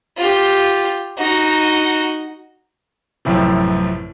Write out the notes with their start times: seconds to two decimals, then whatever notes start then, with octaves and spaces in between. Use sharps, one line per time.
0.17 F4 G4
1.18 D#4 F#4
3.25 A1 F#2 A2 C3 F3